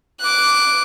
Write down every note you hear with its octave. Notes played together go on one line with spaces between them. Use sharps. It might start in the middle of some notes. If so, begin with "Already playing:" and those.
D6 F#6